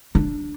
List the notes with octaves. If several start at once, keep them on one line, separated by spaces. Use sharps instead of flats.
D4